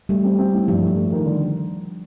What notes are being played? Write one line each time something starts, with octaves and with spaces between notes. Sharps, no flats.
G3 A3
C4
C4
A2
G2 F3
A3
A3
D#3
D3